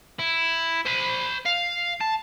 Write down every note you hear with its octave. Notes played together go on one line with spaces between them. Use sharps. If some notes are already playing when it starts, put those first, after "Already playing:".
E4
C5 B5
F5
A5